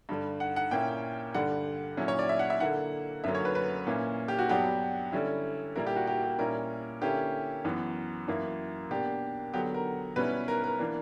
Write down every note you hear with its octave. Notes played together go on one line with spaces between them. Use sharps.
G2 D3 G3
F#5
F#5
A#2 A#3 C#4 E4 G5
G2 D3 G3 F#5
A#2 F#3 C#4 E4
C#5
D5
E5
F#5
E5
D3 A#3 E4 F#5
F#2 D3 F#3 A#3 C#4 E5
C#5
B4
B4
A#2 A#3 C#4 E4
G4
F#4
G2 F#3 B3 D4 G4
D3 G3 C#4 E4
A#2 G3 A#3 E4 A#4
G4
F#4
G4
G4
A#2 G3 C#4 E4 A#4
D3 A#3 C#4 E4 G4
F#2 E3 B3
F#2 E3 A#3 E4
B2 A#3 D4 G4
D3 F#3 B3 G4
A#4
B2 G3 C#4 E4 B4
A#4
A#4
E3 A#3 D4